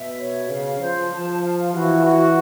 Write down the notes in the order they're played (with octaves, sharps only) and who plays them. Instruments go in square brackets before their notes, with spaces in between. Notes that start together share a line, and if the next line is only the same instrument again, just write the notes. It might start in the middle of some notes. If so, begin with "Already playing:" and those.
Already playing: [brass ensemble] B2 [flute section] E5
[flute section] C#5
[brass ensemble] C#3 [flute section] F5
[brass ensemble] F3 [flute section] C5
[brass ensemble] F3 [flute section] A5
[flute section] F5
[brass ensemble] E3 [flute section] F#4
[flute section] F#4